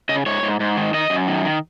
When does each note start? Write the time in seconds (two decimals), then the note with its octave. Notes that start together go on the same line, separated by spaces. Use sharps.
0.09 C#3 D#5
0.26 G#2 C#5
0.43 G#2
0.60 G#2
0.77 D#3
0.94 D#3 D#5
1.10 F#2
1.27 D#3
1.45 D#3